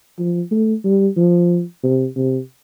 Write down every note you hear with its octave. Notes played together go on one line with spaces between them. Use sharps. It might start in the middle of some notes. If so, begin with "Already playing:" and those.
F3
A3
G3
F3
C3
C3